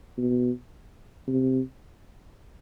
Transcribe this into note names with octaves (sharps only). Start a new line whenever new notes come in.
B2
C3